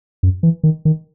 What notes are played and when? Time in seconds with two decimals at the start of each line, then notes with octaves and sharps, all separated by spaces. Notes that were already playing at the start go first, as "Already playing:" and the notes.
0.23 F#2
0.43 E3
0.63 D#3
0.85 D#3